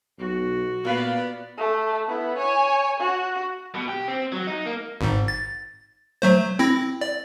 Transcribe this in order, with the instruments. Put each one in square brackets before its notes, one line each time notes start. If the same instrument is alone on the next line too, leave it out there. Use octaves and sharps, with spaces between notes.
[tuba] B1 [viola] F#4
[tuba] A#2 [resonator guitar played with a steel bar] A#3 B4 F5 [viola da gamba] B3 D5
[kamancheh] A3
B3 E4
C#5 G#5
F#4
[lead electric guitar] B2
G4
C4
F#3
D#4
A#3
[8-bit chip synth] G#1 G#2
A6
F#3 A3 C5
C4 E4 A#6
D5